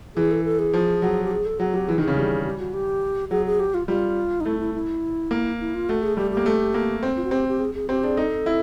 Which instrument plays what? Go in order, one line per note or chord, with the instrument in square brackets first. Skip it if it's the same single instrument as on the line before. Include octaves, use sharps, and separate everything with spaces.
[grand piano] E3 [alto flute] G#4
[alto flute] A4
A4
G#4
[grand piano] F3
F#3
[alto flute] G4
G#4
A4
[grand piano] F#3 [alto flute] G#4
[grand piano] F#3 [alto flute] G4
[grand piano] E3 [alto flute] G#4
[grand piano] D#3
[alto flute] G#4
[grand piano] C#3
G3
[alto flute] G4
F#4
G4
[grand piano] F#3 [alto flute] G#4
[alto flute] G#4
G4
F4
[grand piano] G3 [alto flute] F4
[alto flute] D#4
[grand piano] A3 [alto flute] E4
[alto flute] E4
E4
[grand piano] A#3
[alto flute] E4
F4
[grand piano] A3 [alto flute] F#4
[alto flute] G#4
[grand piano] G3 [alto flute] G4
[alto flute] G4
[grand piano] A#3
A3
A#3
C4
[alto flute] F4
F#4
[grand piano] C4 [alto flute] G4
[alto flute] G4
G#4
G#4
[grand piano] C4 [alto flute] G4
[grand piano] D4 [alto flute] G#4
[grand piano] D#4 [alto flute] A4
[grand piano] E4